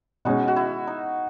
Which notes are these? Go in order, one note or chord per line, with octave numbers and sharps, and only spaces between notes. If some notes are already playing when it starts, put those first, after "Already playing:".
B2 G#3 C#4 D#4 F#4
F#4
E4
D#4